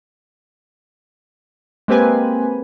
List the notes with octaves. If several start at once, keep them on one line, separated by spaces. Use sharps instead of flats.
G#3 A#3 C4 G4 B4 G#5